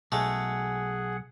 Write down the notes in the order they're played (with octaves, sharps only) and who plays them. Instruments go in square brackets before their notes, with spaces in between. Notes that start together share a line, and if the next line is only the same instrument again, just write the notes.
[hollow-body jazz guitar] B1 [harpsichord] G#3 A3 [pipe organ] G#4 F#5